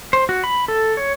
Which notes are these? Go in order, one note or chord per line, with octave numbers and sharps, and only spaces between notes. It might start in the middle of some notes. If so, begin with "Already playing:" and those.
C5
F#4
B5
A4
C#5